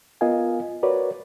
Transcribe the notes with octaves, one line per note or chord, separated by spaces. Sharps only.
B3 F4 A#4 D#5 F5 G#5
F#4 A#4 B4 C#5 D5